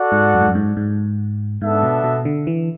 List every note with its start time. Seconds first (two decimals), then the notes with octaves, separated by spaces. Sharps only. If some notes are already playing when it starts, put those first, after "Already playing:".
Already playing: F#4 A4 D5 F#5
0.12 G#2
0.34 F#2
0.41 G#2
0.48 F#2
0.55 G#2
0.77 G#2
1.61 G#2 B3 D4 A4 E5
1.83 B2
2.04 B2
2.25 D3
2.47 E3